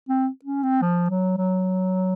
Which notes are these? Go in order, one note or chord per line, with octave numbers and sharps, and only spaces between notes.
C4
C#4
C4
F3
F#3
F#3